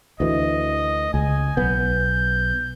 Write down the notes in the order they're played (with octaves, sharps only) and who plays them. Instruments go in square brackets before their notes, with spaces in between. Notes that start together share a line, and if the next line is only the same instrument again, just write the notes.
[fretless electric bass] D2 E3 [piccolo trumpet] D#5
[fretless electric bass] C#2 [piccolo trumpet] G#5
[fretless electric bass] B1 B3 [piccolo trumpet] G6